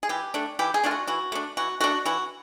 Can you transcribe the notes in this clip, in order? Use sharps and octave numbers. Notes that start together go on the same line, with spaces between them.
G#4
E3 G4
A3 D4
E3 G4
G#4
A3 D4 F4
F#4
E3 F#4
A3 D4
E3 F#4
A3 D4 F#4
E3 F#4